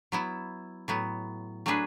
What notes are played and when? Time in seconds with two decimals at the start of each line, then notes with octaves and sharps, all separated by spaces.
0.12 F#3 B3 E4
0.88 A2 F#3 B3
1.66 F#3 A3 D4 G#4 B4